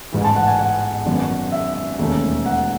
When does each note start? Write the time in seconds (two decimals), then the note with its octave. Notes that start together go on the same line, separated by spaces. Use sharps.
0.12 A1 G#2 E3
0.21 G#5
0.24 A5
0.36 F#5
0.48 G#5
0.59 F#5
1.06 G#1 F#2 E3 B3
1.52 E5
1.99 E1 D#2 D#3 A3 C#4
2.46 F#5